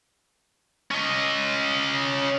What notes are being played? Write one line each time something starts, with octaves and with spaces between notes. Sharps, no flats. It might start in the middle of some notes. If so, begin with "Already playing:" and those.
C#4 D#5